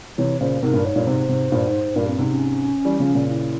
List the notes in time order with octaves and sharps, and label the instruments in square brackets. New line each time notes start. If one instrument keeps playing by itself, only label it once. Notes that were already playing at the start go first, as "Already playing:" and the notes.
[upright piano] C3 E3 [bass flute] C#5
[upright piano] A#2 C#3 [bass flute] C5
[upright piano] G#2 C3 [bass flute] A#4
[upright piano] G2 A#2
[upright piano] G#2 [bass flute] C#5
[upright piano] G2 A#2
[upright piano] G#2 C3 [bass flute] C5
[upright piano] G#2 C3
G2 A#2
G#2
G#2
[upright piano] G2 A#2 [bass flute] A#4
[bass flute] C4
[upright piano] G#2 C3 [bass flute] C#4
[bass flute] C#4
[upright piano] E3 G3
C#3 F3
A#2 C#3
[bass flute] E4